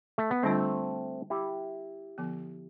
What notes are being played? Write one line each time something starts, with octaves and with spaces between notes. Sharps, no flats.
A3
B3
D3 G3 A3 C4 D4 F4 C5
E4 G4
D3 F3 B3